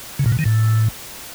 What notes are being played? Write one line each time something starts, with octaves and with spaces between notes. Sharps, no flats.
C#3
A#2
B2
D#3
A2